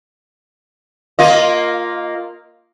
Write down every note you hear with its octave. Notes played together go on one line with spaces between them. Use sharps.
A#3 F4 D#5